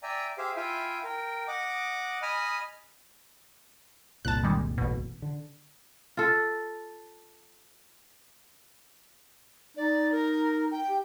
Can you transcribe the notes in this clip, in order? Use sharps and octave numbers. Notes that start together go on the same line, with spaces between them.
D5 E5 G5 G#5 A#5
G4 G#4 C5 E5 F5
E4 F4 E5 F5 G5 G#5
A#4 G5
D#5 F#5 D6
D#5 G#5 B5 D#6 F6
F1 C2 A#2 A5 F#6
D#3 G3 G#3
A1 B2
D3
F4 A4
D#4 D5
A#4
G5
G4